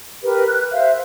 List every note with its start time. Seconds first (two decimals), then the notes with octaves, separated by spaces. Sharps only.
0.23 G4 A#4 B4
0.47 F#6
0.72 C5 E5 F5